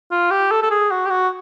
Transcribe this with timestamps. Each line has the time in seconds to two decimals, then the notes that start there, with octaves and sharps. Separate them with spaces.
0.11 F4
0.31 G4
0.51 A4
0.62 A4
0.71 G#4
0.91 F#4
1.05 G4
1.10 F#4